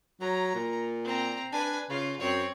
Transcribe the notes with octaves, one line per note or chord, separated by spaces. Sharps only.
F#3 A#5
A#2
C4 A#5
D4 B4 G#5
C#3 F4
F#2 C4 C#5